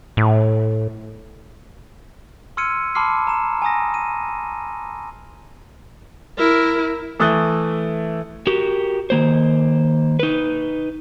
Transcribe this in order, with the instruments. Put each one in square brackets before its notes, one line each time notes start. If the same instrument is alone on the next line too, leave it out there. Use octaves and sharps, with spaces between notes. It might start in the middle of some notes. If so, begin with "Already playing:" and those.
[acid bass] A2
[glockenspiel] C6 E6 F6 G#6 C#7 D#7
A5 B5 C6 D6 F6 C7
A#5 E7
G#5 A#5 D#6 A#6
D#7
[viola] E4 A#4
[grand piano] E3 A3 D#6 F#6 A6 G7
[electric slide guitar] F#4 G4 A#4
D#3 A#3 C5
D#4 B4